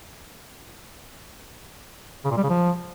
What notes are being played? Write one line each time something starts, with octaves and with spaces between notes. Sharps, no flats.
C#3
A#2
G3
C#3
F3